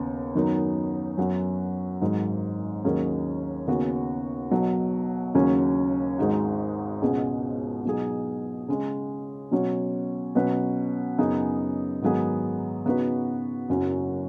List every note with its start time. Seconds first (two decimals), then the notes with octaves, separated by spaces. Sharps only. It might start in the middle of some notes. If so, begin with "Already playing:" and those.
Already playing: D#2 C#3 B3
0.35 F#2 D#3 F#3 B3 D#4
1.17 F#2 F#3 B3 F#4
2.01 G#1 G#2 D#3 F#3
2.84 D#2 D#3 F#3 C#4 G#4
3.68 D#2 C#3 B3 F#4
4.51 B1 B2 F#3
5.34 D#2 C#3 F#3 C#4
6.18 G#1 G#2 G#3 D#4 F#4
7.02 C#2 B2 G#3 C#4 G#4
7.85 B2 F#3 D#4 G#4
8.68 C#3 G#3 C#4
9.51 B2 F#3 C#4 F#4 C#5
10.35 B2 F#3 C#4 F#4 B4
11.18 F#2 C#3 B3 D#4 G#4
12.02 G#2 D#3 F#3 B3 G#4
12.86 C#3 B3 D#4 F#4 B4
13.69 F#1 F#2 F#3 C#4 F#4